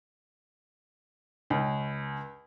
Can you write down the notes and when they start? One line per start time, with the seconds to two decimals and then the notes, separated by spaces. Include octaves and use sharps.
1.50 C#2